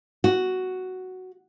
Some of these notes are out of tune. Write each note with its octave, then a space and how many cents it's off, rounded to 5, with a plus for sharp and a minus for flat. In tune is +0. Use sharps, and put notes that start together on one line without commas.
F#4 +5